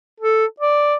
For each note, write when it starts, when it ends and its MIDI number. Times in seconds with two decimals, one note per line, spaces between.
0.20 0.46 69
0.60 0.96 74